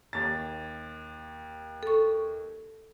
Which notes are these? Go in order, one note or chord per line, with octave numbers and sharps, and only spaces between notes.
D#2 A6
A4 C#6